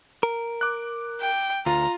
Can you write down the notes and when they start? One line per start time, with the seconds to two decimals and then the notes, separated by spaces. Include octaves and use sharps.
0.23 A#4
0.61 D6 F#6
1.21 G5
1.66 D2 F4 A#5